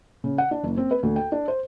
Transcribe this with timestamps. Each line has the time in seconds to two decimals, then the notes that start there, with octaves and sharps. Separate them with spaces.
0.24 C#3
0.38 F#5
0.51 D4
0.63 F#1
0.77 C4
0.91 B4
1.03 D2
1.16 G5
1.32 D4
1.48 C5